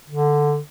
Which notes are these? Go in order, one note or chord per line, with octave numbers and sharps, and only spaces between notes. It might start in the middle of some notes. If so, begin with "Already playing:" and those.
D3